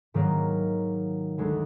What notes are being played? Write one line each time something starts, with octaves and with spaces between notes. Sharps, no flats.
G#2 D#3 F#3 A#3
D2 D3 G#3